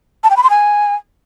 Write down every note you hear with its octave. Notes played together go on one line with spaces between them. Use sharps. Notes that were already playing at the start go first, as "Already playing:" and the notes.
A5
G5
B5
C6
G#5